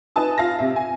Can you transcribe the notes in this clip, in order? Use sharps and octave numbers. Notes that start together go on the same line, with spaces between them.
D#4 B4 G#5 A5 D#6
F4 F5 A5 A#6
C3 E5
G#5